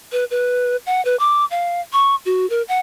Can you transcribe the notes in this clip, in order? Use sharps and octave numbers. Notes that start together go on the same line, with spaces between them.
B4
B4
F#5
B4
D6
F5
C#6
F#4
A#4
F#5